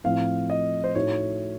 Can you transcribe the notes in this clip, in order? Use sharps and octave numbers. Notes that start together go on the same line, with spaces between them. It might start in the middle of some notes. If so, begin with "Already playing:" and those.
A2 F3 C4 F5
D#5
C5
A2 A3 D#4 F#4 C#5